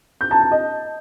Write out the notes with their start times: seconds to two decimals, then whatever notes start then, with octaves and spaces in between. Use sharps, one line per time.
0.21 G6
0.31 A5
0.41 A5
0.51 D#5